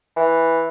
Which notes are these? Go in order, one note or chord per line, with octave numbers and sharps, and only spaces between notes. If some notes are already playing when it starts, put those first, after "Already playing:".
E3